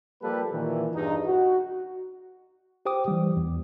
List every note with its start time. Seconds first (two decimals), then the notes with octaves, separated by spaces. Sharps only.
0.23 F3 G3 A#3 G4 A4 B4
0.51 A#2 D#3 E3
0.95 E2 G2 D#4
1.26 F#4
2.85 G4 C5 G5 D6 D#6
3.08 E3 G3
3.37 E2